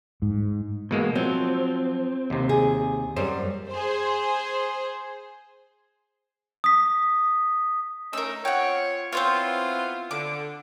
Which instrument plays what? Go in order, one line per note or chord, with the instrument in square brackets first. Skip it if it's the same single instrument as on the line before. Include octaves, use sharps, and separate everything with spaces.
[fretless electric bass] G#2
[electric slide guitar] B2 [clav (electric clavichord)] E3 G#3 A#3
[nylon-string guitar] F3 [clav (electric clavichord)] F#3 [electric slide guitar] C4
[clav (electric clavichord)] D#2 C3
[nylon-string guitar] G#4
[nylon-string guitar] F#2 [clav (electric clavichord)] G3 C5
[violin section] G#4 C5
[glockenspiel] D#6 B6
[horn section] A3 C#4 D#4 [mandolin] A#4 E6
[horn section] C4 F4 C#5 [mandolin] F#5 G5
[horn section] B3 E4 F4 [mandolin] C4 C5 C#5
[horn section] D3 [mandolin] D6